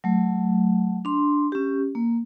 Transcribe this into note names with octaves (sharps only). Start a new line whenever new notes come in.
F#3 A3
D4 C6
C#4 G4
A#3